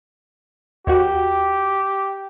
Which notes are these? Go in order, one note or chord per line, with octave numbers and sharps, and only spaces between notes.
D#2 F#4 G4